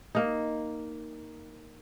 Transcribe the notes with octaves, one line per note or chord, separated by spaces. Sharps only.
A#3 D#4